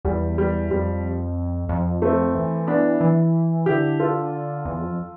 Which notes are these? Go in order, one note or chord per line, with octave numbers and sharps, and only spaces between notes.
E2 G3
G3
F2 G3
F2
A3 C4
E3
B3 D4
E3
D3 E4 G4
F4 A4
E2
F2